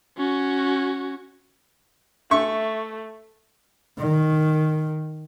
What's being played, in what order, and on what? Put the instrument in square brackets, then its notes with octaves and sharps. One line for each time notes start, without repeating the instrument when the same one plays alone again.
[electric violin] C#4 F#4
[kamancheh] A3 [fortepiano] E5 C#6
[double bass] D#3